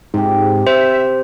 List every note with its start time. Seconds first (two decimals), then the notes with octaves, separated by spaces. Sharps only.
0.14 G#2 C3 G4
0.67 C5 E5